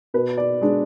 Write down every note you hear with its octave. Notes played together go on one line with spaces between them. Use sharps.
B2 B4
D5
G#3 D4